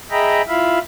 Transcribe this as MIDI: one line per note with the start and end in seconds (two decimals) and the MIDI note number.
0.11 0.42 68
0.11 0.42 75
0.11 0.42 76
0.11 0.42 79
0.11 0.42 82
0.11 0.42 83
0.48 0.79 64
0.48 0.79 65
0.48 0.79 76
0.48 0.79 77
0.48 0.79 83